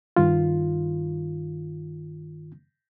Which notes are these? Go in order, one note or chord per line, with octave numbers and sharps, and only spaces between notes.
G2 D#3 F4